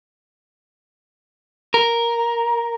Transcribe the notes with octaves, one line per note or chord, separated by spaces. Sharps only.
A#4